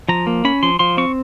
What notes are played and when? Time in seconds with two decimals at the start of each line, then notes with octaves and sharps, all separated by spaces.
0.09 F3 A#5
0.27 A#3
0.45 C#4 B5
0.63 F3 C6
0.79 F3 C6
0.97 C4 C#6